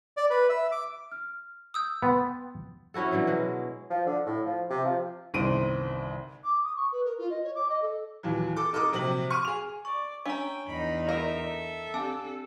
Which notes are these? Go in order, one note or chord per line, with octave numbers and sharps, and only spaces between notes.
D5
B4
E5
D6
F6
D#6 E6 G6
B3 G5 C6 A6
C#4 E4 F#4 A4
B2 D3 E3 F#3
B2 F#3 G#3
F3
D3
A2
F3
C3
F3
G1 C2 D#3 C5 D7 D#7
D6
D#6
C#6
B4
A#4
F4
D#5
C#5
D6
D#5
A4
D#2 A#2 E3 F#3
A4 D6
D#4 A4 A#4 D6 D#6
A#1 C3 F#3 F#7
C#6 F6 D#7
G#4 F7
D5 C#6
C#4 D4 G5 A#5
E2 D#4 B5
A#4 E5
A4
C4 D4 G4 G#5 A5